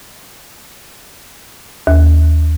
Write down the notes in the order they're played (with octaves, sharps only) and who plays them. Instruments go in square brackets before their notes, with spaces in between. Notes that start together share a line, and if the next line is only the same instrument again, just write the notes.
[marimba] D#2